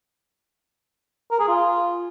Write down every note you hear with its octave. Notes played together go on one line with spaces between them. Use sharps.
A#4
G#4
F4